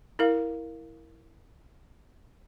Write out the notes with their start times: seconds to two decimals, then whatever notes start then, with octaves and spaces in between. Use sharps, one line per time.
0.19 E4 A#4 F5